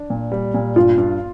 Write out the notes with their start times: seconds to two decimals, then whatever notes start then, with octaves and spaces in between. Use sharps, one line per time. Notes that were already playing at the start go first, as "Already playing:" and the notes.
Already playing: D4
0.10 A#2
0.32 G3
0.54 A#2
0.76 G2 F4
0.98 G2